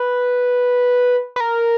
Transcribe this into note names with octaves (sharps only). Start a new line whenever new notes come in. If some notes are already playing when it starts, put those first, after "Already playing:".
Already playing: B4
B4
A#4